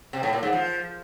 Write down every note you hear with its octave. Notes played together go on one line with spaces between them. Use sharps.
C3
A2
A#2
G#2
F3